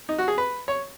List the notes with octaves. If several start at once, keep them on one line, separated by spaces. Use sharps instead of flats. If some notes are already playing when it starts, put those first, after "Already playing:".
D#4
F#4
G#4
B4
C#5